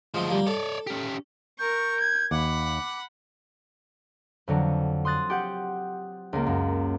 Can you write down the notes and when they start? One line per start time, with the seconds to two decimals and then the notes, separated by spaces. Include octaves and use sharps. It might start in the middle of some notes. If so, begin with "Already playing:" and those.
0.14 D2 F3 G#3 C4 F4
0.29 G3 A#3
0.47 A4 C#5 D5
0.87 C#4 G4
1.59 A#4 C#6 G6
2.00 G#6
2.31 D#2 F#5 B5 D6
4.47 F2 D3 F#3
5.05 C6 D#6 F#6 A6
5.30 G4 F#5 G6
6.33 C#2 A#3
6.46 F#2